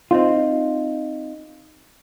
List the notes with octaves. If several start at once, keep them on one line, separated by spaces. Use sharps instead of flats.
C4 D#4 F4